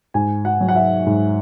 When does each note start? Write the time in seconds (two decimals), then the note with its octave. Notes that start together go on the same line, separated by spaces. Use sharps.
0.14 G#2 G#5
0.45 F#5
0.61 F#3
0.68 F#5
0.75 E5
1.06 G#2